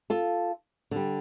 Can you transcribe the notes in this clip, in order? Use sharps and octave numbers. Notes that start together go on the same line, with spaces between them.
F4 A4
D3 G3